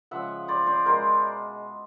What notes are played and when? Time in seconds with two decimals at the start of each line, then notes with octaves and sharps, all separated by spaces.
0.11 C#3 F3 G#3 E5 F#5
0.48 C5 D5
0.67 C5 D5
0.85 B2 G#3 A#4 C5